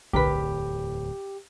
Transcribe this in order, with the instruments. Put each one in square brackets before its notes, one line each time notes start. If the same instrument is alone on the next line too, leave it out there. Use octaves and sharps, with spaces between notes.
[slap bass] D1 E2 [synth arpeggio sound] B1 D3 B6 [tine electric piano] G4 [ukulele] A#4 B4